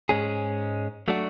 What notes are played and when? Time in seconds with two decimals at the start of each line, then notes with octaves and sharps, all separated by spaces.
0.09 G#2 G#3 C#4 G#4
1.08 F#3 A3 D4 F#4